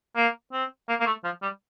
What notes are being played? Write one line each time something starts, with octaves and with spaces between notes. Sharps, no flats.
A#3
C4
A#3
A#3
A3
F3
G3